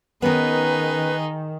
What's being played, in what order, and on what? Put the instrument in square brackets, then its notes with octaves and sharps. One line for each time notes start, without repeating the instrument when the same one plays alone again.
[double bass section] D#3 [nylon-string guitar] B3 C#4 A#4 [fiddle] D#4 G#4 [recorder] B4